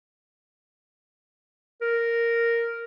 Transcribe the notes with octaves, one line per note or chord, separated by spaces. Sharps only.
A#4